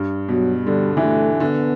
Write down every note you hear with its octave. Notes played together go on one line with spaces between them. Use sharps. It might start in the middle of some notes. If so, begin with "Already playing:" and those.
Already playing: G2
B2 F#3
D3 G3
E3
D3 A3
D3 B3